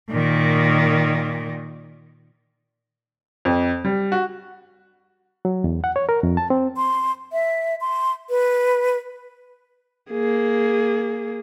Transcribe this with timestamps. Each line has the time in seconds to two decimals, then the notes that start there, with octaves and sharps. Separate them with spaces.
0.11 A#2 D#3
3.45 F2
3.85 G3
4.12 F#4
5.45 F#3
5.64 E2
5.84 F#5
5.96 C#5
6.09 A#4
6.23 F2
6.37 A5
6.50 C4
6.76 C6
7.33 E5
7.81 C6
8.30 B4
10.11 A#3 G#4